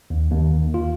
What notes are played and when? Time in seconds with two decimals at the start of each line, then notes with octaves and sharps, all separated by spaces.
0.10 D#2
0.31 D#2
0.74 F4